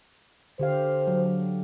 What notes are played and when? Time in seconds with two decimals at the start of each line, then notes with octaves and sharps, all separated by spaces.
0.59 D3 G4 C5 F5
1.07 F#3